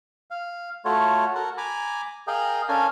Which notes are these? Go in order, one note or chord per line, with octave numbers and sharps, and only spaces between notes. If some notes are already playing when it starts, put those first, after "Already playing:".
F5
A3 F4 F#4 A4 C#5
F#4 A4 A#4 F#5
G#5 A#5 B5 D6
G#4 A#4 D#5 F5 G5
C#4 D4 A4 A#4 F5 G#5